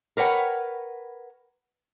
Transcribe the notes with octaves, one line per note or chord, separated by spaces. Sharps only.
A#4 B4 C#5 F#5 G5